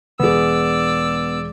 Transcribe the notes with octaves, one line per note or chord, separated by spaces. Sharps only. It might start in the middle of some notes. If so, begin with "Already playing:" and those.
E1 B3 G#4 D5 E6